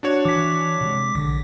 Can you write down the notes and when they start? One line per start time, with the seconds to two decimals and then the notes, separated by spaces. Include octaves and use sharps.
0.03 D4 F#4 C#5
0.25 E3 D6 B6
0.81 C3 G#3
1.15 A#1 D3